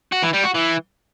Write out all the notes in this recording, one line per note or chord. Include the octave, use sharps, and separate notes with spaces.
F#4
E3
G3
F#4
E3